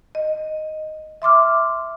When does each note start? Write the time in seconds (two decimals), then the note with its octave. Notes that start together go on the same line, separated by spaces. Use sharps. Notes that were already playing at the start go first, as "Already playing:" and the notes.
0.15 D#5
1.22 E5 C6 D6 F6